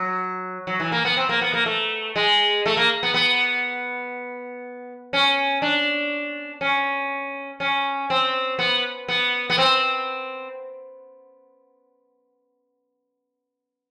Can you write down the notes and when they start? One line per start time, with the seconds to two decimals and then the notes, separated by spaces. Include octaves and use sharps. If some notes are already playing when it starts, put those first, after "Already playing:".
Already playing: F#3
0.67 F#3
0.80 E3
0.92 A#3
1.05 B3
1.17 C4
1.29 A#3
1.41 B3
1.53 A#3
1.66 A3
2.16 G#3
2.66 A3
2.77 A#3
3.03 B3
3.14 B3
5.13 C#4
5.62 D4
6.61 C#4
7.60 C#4
8.10 C4
8.59 B3
9.08 B3
9.50 B3
9.58 C4